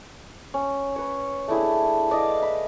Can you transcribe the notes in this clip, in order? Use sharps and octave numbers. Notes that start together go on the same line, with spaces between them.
C#4
B4 C#5
A3 D4 E4 G#4
B4 D5 D#5 F5
B5